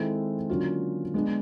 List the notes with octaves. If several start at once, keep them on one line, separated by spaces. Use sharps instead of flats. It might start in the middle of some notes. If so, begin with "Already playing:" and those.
Already playing: D#3 G#3 C4 E4 A4
D3 F#3 A#3 C#4 F4
G#3 B3 D4